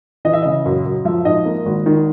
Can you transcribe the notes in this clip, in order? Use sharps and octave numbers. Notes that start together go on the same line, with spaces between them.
E3 D#5
E5
C#3 D#5
F#2
F#2
F3 E5
G#2 D#5
A#3
G#1
D#3